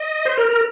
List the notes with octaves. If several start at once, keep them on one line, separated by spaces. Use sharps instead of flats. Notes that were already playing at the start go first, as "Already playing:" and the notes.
Already playing: D#5
C5
A#4
A#4